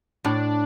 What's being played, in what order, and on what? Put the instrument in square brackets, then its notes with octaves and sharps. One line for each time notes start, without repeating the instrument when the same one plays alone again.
[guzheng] A2 [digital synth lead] D4